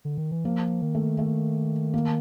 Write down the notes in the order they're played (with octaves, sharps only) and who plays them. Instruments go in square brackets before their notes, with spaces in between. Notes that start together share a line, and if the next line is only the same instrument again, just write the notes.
[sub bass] D3
D#3
E3
[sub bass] F3 [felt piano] A#3
[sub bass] D#3
[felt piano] A3
A3
A#3